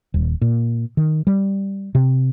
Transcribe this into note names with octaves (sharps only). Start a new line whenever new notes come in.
D#1
A#2
D#3
G3
C3